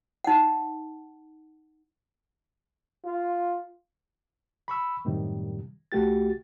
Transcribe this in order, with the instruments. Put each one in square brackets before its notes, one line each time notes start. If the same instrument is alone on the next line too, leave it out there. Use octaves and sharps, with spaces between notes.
[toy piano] D#4 F#5
[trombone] F4
[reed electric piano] B5 C#6 E6
F#2 A2 C3 D#3 G3
C2 A3 F#4 G4 A6